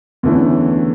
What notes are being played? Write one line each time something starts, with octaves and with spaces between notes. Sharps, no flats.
E2 D3 A3 C#4 E4